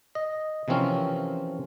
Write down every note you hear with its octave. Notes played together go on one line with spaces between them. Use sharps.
D#5
C3 E3 F3 C4 C#4 A#4